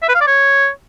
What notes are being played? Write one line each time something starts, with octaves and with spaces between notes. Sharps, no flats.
E5
B4
F5
D5
C#5